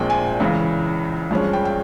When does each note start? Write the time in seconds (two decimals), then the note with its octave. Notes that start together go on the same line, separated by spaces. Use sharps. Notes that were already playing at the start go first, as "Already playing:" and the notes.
Already playing: A#1 A#2 F3 G#3 C4 G5
0.10 G#5
0.40 C#2 C#3 E3
1.31 G2 F3 G#3 C#4
1.53 G5
1.65 G5